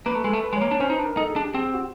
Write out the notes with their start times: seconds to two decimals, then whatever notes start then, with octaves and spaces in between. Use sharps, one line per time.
0.06 A#3 B4
0.15 A3
0.24 G#3 A4
0.33 A3
0.43 B4
0.53 G#3
0.56 C#5
0.61 A#3
0.68 D4 C#5
0.80 C#4 C5
0.90 D#4 B4
0.99 D4
1.05 A#4
1.17 D#4 A4
1.30 G#4
1.36 D4
1.42 G4
1.55 C4 G#4
1.64 G4
1.74 F#4